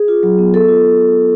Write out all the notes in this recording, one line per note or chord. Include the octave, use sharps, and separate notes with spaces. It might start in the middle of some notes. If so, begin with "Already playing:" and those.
Already playing: G#4
F4
F#3
B3
B3 A4
F4